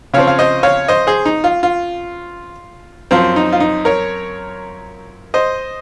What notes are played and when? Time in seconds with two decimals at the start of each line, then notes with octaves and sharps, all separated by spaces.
0.14 C#3 F3 C4 C#5 F5
0.27 F5
0.39 C5 D#5
0.63 C#5 F5
0.88 C5 D#5
1.07 G#4 C5
1.25 D#4
1.44 F4
1.63 F4
3.11 F#2 F3 C4 F4
3.36 D#4
3.53 F4
3.60 D#4
3.85 A#4 C#5
5.34 C5 D#5